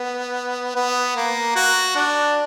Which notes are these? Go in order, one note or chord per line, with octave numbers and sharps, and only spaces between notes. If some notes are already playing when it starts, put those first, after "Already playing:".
Already playing: B3
B3
A#3
F#4
D4